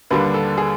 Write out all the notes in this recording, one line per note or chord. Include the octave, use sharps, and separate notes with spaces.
D#2 D3 G3 A#3 D4 B4
A4
G#4